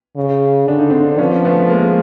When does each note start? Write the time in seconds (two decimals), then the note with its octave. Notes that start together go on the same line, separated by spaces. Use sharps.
0.16 C#3
0.68 D3 D4
0.79 D#4
0.90 C4 D4
1.18 F3 B3 C#4
1.45 A3 B3
1.70 G#3 A#3